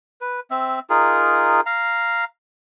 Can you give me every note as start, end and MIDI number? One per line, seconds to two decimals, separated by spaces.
0.21 0.40 71
0.51 0.80 60
0.51 0.80 76
0.90 1.61 63
0.90 1.61 65
0.90 1.61 68
0.90 1.61 70
1.66 2.25 77
1.66 2.25 82